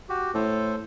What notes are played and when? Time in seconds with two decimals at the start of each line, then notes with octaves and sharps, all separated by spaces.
0.09 F#4 G4
0.35 A2 A4 C5